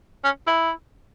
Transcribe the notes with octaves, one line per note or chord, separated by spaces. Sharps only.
C#4
E4